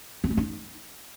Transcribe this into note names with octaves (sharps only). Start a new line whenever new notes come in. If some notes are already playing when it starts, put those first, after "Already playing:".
C4
A3
D#4